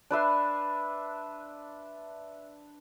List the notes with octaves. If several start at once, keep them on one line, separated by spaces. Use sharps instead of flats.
D4 B4 E5 C6